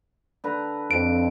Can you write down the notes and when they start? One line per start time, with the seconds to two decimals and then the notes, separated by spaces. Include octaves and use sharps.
0.44 D3 B4 A#5
0.91 F2 D7